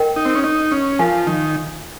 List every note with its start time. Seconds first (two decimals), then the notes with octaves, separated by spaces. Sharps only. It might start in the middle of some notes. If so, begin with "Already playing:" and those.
Already playing: A#4 D#5 G5
0.16 D#4
0.25 C4
0.36 C#4
0.44 D#4
0.72 C#4
0.99 F3 F4 A#4 F5 G#5
1.27 D#3